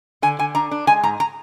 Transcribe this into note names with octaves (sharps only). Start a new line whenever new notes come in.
D3 G#5
D3 G#5
D4 A#5
D4
G#3 G#5
G#2 A#5
A#5